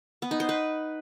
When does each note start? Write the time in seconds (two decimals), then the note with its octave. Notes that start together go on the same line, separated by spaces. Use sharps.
0.22 B3
0.31 D#4
0.40 C5
0.49 B4